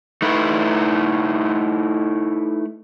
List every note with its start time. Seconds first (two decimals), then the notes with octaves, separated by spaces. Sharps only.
0.22 A3 D#4 E4 B4